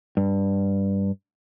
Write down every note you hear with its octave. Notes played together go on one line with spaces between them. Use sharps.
G2